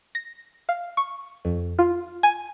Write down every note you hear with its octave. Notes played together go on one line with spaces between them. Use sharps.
A#6
F5
C#6
F2
F4
G#5